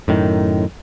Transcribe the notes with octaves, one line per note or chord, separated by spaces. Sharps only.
F#2 A2 D#3